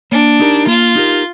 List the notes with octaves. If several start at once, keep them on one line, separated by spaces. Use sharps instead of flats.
A#3 D4
D#4 G4 A#4
A#3 F4
D#4 G4 A#4